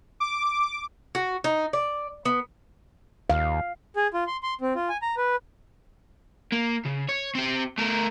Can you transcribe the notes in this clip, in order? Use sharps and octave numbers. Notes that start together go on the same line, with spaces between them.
D6
F#4
D#4
D5
B3
D#2 F5
G#4
F4
C6
C6
C4
F4
G#5
A#5
B4
A#3
C#3
C#5
C4 G4
A3 A#4